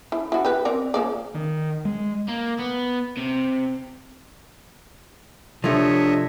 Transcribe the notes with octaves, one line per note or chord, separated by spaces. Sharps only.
E4
E4 F#4
G4 B4
C4 A#4 D5
F3 A#3 D5
D#3
G#3
A#3
B3
C3
C3 F3 A3 D4 C#5 D#5 E5